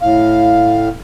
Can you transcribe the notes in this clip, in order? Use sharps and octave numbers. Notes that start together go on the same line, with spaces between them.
A2 F5